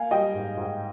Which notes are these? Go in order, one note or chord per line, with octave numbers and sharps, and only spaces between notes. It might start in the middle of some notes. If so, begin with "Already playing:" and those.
Already playing: A#3 F5 G#5
G3 D#5 G5
G#2
G#2